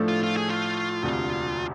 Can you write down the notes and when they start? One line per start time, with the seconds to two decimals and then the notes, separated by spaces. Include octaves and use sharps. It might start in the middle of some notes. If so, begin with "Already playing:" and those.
Already playing: A2 F3 A3 D4 A4
0.08 F4
0.23 F4
0.37 G#4
0.49 F4
1.02 E1 D2 C3